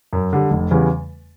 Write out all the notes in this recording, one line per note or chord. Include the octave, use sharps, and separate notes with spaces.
F#2
D3 G3
F1
E2 C#3 E3 G3